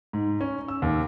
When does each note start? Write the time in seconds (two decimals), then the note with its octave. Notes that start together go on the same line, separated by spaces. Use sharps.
0.13 G#2
0.41 C#4
0.68 E6
0.82 D#2